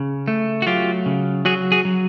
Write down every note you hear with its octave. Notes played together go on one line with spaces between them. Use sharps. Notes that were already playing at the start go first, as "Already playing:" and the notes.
Already playing: C#3
A3
F#4
F#3 F4 G4
C#3
F#3 F#4 G#4
F#4 G#4
F#3